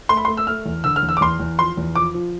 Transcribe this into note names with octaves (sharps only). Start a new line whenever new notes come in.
A3 C6
B5
C6
A3
E6
A3 F6
E2
D3 E6
F6
E2
E6
D6
E2 C6
E2
F3 C6
E2
F3 D6
F3